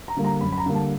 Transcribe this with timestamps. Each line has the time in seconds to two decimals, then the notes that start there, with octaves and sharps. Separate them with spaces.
0.08 A#5
0.17 D3 G3 A#3
0.24 A#5
0.41 F#2 B5
0.52 B5
0.58 A#5
0.66 D3 G3 A#3
0.75 A5